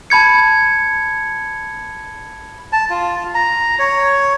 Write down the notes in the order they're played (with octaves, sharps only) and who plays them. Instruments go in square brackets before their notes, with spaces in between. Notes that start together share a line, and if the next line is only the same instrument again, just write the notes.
[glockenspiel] A5 B5 G#6 C#7
[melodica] A5
F4
A#5
C#5